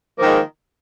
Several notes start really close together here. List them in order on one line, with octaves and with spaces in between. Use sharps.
A#3 F3 D#3 G#3